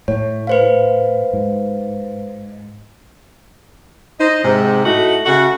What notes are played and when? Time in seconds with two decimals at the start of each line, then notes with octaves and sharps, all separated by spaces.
0.08 A2 C#5
0.47 B4 C5 F5
1.33 G#2
4.20 D#4 C5 D#5
4.43 G#2 C3
4.86 A2 A3 D#4 F#4
5.26 C#3 A3 F#4